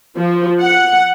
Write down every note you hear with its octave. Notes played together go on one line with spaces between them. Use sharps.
F3
F#5